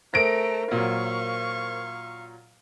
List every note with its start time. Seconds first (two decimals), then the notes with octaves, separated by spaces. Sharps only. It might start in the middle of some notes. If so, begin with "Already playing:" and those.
0.14 A3 A#4 C5 A#5 A#6 D7
0.71 A#2 F#3 F5 C#6